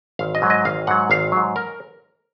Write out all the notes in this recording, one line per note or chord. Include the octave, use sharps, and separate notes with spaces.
G#1 F5
D#5
G#2 F#3
D#5
G#1 F5
G#2 F#3 F#5
G#1 F5
G#2 F#3
A#4